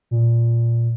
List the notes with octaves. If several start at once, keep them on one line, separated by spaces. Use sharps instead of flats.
A#2